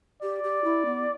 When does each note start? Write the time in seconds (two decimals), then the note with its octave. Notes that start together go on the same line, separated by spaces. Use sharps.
0.22 G4 D5
0.43 G4
0.64 E4
0.85 B3